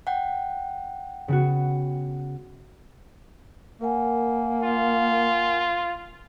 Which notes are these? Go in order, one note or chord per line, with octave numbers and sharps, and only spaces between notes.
F#5 G5
C#3 B3 F#4
A#3 A#4 F#5 G#5
F4